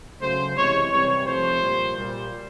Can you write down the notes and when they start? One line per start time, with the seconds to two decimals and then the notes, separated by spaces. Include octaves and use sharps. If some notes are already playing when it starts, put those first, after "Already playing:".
0.21 C#3 F#3 A3 C5
0.56 C3 E3 G#3 C#5
0.91 C3 E3 G3 C#5
1.26 C3 F3 A3 C5
1.62 A#2 G3
1.97 A#2 G3